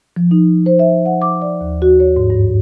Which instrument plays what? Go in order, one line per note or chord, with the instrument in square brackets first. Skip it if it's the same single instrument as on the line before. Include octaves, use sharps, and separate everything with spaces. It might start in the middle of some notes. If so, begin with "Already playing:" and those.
[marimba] F3
D#4
C5
E5
F#5
D6
D5
D#2
F#4
C#5
G#2
G2